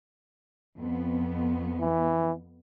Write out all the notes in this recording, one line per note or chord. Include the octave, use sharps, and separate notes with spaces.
F2 B3
E3